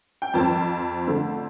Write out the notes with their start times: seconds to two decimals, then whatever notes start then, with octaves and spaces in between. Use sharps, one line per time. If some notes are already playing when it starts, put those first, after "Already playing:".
0.22 G5
0.34 F2 F3 C4 A5
1.07 D3 A3 C4